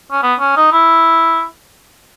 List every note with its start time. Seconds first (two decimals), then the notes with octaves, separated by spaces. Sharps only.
0.11 C#4
0.22 B3
0.40 C#4
0.56 D#4
0.72 E4